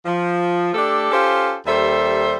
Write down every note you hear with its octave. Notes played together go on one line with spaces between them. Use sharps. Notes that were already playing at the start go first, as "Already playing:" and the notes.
F3
A3 D4 G4 A4
C#4 F4 G4 A4 C5
D#2 G3 A4 C5 E5